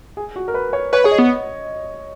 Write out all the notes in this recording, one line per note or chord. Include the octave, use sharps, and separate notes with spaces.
G#4
F#4
A#4
B4
C#5
B4 C#5
G#4 C#5
D#5
B3